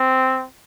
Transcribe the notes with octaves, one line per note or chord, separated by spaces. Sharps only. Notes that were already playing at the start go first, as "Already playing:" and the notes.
Already playing: C4